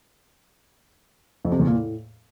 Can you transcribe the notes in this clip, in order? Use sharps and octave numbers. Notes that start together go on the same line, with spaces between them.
F2
C3
E2
A#2
A2